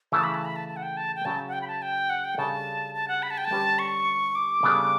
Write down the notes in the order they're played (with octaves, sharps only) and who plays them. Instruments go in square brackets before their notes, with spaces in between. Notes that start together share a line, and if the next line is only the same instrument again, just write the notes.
[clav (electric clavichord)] C#3 E3 A3 E4 [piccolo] A5
[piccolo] B5
A5
B5
A5
A5
F#5
G5
A5
G5
[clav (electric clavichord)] C#3 F#3 C#4 F#4 [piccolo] A5
[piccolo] F#5
G5
B5
A5
G5
F#5
G5
[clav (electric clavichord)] C#3 G3 D4 A4 C#5 [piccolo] A5
[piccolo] A5
F#5
B5
A5
G5
A5
[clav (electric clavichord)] D3 G3 C#4 G4 B4
[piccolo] C#6
D6
[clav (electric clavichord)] C#3 G3 B3 D4 A4